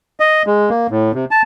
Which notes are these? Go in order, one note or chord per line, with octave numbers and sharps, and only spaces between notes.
D#5
G#3
A#3
A2
C3
A5